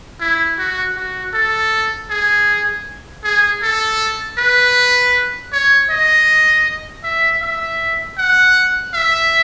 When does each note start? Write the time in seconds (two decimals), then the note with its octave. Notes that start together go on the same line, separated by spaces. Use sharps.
0.20 E4
0.59 F#4
0.96 F#4
1.34 A4
2.10 G#4
3.24 G#4
3.63 A4
4.38 B4
5.52 C#5
5.90 D#5
7.04 E5
7.42 E5
8.18 F#5
8.94 E5